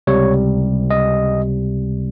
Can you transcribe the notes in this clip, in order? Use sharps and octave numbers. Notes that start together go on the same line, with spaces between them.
C#2 C3 G3 C#5
D#5